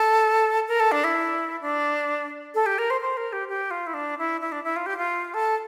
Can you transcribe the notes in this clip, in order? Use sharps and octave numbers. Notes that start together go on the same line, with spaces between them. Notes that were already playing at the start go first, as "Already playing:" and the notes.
Already playing: A4
A#4
A4
D4
E4
D4
A4
G4
A#4
C5
C5
A#4
G4
G4
F4
E4
D4
E4
E4
D4
E4
F4
G4
F4
A4